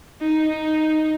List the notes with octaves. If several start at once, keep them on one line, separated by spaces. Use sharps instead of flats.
D#4
D#4